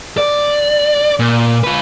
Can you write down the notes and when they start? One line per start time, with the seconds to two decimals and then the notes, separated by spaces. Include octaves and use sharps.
0.17 D5
1.19 A#2
1.64 F4 B4